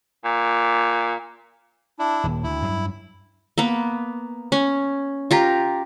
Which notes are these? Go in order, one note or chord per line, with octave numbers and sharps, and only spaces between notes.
A#2
D4 E4
D#1
D2 E4
G2 F#3
A#3 B3
C#4
F4 G4 A#4